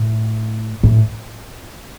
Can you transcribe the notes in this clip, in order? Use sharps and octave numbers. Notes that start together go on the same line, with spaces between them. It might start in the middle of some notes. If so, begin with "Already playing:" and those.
Already playing: A2
A2